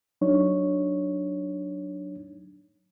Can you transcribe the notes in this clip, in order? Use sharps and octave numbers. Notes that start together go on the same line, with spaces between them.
F#3 D4 D#4 C#5